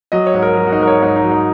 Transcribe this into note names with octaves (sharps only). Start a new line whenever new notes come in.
F#3 D#5
C#5
G#2
A#4
F#3 A#4
F#4
D#4
G#2 A#4
C#5
G#2 D#4
D#4
F#3
D#4